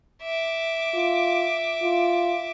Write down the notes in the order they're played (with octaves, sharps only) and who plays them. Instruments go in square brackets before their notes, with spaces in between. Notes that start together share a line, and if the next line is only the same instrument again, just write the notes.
[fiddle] E5 D6
[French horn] F4
F4